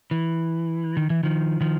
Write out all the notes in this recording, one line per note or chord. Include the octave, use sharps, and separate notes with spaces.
E3
D#3
E3
D#3 F3
D#3 F3